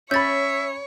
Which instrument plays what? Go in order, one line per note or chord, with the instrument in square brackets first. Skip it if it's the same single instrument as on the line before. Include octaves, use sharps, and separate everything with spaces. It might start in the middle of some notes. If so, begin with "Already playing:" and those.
[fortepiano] C#4 B5 [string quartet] C#5 [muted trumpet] E5 [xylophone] G6 A6